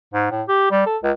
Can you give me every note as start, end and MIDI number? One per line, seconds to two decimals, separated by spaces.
0.14 0.26 44
0.31 0.43 45
0.48 0.69 67
0.71 0.84 55
0.86 0.97 69
1.03 1.11 37